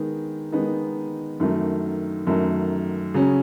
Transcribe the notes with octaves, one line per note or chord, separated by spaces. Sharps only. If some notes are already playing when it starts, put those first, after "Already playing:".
Already playing: D#3 G#3 B3 D#4
D#3 G#3 B3 D#4
F#2 D#3 F#3 A3
F#2 D#3 F#3 A3
C#3 F#3 C#4